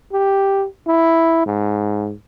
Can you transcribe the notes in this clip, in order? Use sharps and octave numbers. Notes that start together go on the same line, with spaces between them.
G4
E4
G#2